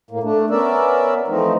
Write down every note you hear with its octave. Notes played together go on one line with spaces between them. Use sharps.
A2 A#3
A3 D4
B3 C#4 A#4 D5 E5
E3 F3 A3 C4 D#4